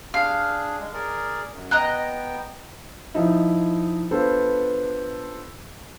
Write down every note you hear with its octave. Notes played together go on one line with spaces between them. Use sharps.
D4 G#4 F5
G#3
G#4 A#4 D5
F#2
B3 D#5 G5 A#5 F#6
F3 D#4 E4
B3 D4 F4 A4 B4 C5